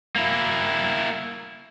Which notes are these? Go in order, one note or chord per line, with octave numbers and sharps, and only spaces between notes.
A#3 E4